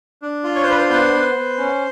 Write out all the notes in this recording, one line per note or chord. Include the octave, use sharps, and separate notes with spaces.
D4
F4
C#5
C5
D4 B4
C5
B3 C5
B3
B3
C#4